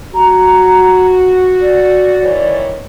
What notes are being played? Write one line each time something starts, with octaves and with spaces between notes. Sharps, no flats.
F#4 A#5
D5
D#3 E3 C#5